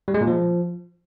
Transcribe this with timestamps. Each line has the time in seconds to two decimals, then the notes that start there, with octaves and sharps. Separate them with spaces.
0.08 G3
0.14 G#3
0.21 A#2
0.27 F3